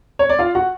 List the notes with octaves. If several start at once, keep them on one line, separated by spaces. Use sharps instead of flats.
C#5
D5
F4 F5
F#4 F#5